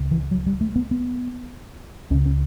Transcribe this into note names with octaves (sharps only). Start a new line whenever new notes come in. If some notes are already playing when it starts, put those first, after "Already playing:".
Already playing: C#2 C#3
E3
F#3
G3
A3
B3
B3
C#2 C#3 C#4
C#4